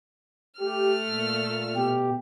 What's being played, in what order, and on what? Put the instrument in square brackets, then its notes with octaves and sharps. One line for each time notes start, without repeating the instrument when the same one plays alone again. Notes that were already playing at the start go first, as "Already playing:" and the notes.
[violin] A3 F6 [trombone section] G4
[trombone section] A#2
[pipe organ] B2 G4